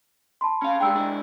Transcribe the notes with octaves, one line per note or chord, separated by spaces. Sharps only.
A5 B5 C6
C#4 F5
G3 G#3 D4 G5 A#5 E6
G#3 D4 E4